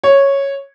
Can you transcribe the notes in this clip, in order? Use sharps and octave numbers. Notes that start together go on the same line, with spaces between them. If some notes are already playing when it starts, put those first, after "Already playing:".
C#5